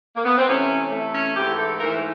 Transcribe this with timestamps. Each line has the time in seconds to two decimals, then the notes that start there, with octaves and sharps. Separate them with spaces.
0.15 A#3
0.25 B3
0.37 C4
0.48 C3 E3 A3 C#4
0.91 C3 E3 A3
1.14 C#4
1.36 G#2 E3 A3 G4
1.57 A4
1.79 G#2 E3 A3 A#4